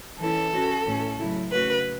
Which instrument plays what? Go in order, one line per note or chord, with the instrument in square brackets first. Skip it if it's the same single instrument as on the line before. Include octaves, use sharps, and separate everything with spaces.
[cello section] E3 C#4 E4 [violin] A4
[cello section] E3 C#4 F#4
A2 E3 C#4
C#3 F#3 A3 E4
[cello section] C#3 A3 F#4 [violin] B4